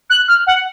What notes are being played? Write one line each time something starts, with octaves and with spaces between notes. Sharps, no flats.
F#6
F6
F#5